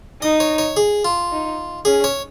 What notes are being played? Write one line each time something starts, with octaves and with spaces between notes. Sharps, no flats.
D#4 D#5
C#5
C#5
G#4
F4
D#4
C#4 G#4
C#5